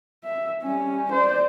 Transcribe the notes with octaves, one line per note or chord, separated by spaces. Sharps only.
E5
G3 C#4
C5 D5